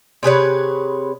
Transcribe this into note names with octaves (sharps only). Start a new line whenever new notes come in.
C3 G#4 B4 C#5